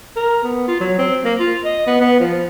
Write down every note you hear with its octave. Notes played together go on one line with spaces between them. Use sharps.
A#4
B3
F4
F#3
C4
A#3
F4
D#5
B3
B3
F3